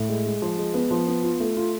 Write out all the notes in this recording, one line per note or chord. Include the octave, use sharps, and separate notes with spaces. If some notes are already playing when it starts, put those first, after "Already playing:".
Already playing: A2
G#3
G#3
F3
G#3
B3
F3
B3
F4
A3
F4